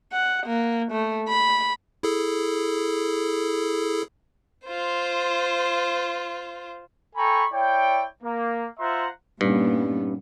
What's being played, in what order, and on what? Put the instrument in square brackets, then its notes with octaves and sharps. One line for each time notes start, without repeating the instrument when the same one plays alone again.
[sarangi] F#5
A#3
A3
B5
[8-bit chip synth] E4 G#4 A4
[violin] F4 C5
[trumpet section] A4 G5 G#5 A#5 B5 C#6
E4 C#5 D5 G5
A#3
F4 C5 E5 F#5 A#5 C6
[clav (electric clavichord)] G2 [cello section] A#2 G3 B3 [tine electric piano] C#4 D#4